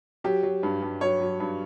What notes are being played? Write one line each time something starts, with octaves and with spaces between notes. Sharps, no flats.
F#3 G4
F#3
G2
G2
F#3 C#5
F#3
G2